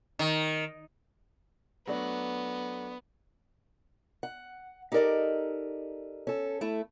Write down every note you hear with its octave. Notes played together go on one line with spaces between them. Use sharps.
D#3
F#3 A3 B3 D4
F#5
D#4 G4 A4 A#4 D5 D#5
C#4 A4
A3 E4